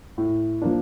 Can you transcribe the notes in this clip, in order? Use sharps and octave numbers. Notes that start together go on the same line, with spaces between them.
A2
F3 A#3 D4